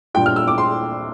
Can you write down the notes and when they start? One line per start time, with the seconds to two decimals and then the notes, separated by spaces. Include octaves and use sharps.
0.14 A#2 G3 D4 F4 G5
0.26 F6
0.36 E6
0.48 D6
0.58 C6